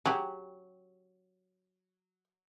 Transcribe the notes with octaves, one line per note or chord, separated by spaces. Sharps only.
F#3 G4 G#4